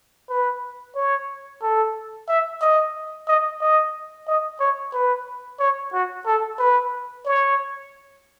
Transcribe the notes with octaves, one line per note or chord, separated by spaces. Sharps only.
B4
C#5
A4
E5
D#5
D#5
D#5
D#5
C#5
B4
C#5
F#4
A4
B4
C#5